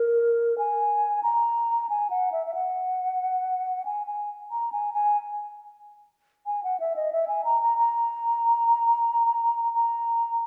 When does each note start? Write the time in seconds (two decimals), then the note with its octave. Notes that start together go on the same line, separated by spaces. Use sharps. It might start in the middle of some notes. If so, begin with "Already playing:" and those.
Already playing: A#4
0.58 G#5
1.23 A#5
1.89 G#5
2.10 F#5
2.32 E5
2.47 E5
2.54 F#5
3.85 G#5
4.07 G#5
4.51 A#5
4.72 G#5
4.94 G#5
6.46 G#5
6.64 F#5
6.80 E5
6.96 D#5
7.12 E5
7.28 G#5
7.45 A#5
7.62 A#5
7.78 A#5
9.74 A#5